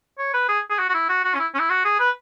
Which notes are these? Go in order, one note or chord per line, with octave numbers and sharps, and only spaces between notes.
C#5
B4
G#4
G#4
F#4
F#4
E4
F#4
F#4
C#4
E4
C#4
E4
F#4
G#4
B4